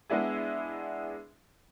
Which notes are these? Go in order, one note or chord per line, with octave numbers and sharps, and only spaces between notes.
G#3 B3 D4 E4 G#4